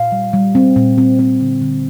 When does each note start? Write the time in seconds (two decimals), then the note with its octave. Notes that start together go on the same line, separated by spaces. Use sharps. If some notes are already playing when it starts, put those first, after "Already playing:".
Already playing: A#2 F5
0.12 G3
0.33 G3
0.55 C4
0.76 A#2
0.98 C4
1.19 C4
1.40 D3
1.62 D3